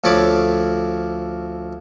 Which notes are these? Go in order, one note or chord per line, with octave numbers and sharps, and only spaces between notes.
D2 F3 A4 C#5 B5 D6